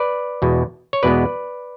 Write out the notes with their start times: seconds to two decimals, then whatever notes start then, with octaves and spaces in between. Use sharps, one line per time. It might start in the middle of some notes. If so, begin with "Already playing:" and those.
Already playing: B4 D5
0.42 E2 B2 G#3
0.93 C#5
1.03 E2 B2 G#3 B3 B4 D5